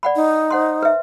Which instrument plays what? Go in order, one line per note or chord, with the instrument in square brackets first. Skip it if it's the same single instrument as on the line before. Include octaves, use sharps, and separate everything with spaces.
[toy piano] D5 F#5 B5
[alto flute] D#4
[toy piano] C5 F#5 C6
B4 E5